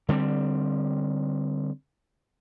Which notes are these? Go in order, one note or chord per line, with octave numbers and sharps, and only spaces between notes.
D3 G3 A#3 C4